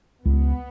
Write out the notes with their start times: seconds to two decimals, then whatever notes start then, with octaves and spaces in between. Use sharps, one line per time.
0.25 C#2 B3